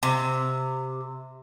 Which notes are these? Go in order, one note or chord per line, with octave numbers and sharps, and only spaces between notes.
C3